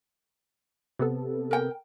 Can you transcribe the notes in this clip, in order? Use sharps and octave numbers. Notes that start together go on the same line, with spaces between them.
C3 B3 A4
A#4 G5